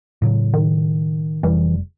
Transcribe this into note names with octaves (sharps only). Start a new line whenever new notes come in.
A2 C#3 F#3
D#3
F1 E3 G3